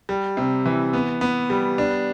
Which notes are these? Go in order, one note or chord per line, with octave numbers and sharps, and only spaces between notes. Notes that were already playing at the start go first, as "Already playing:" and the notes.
G3
C3
E3
B3
B3
G3
D4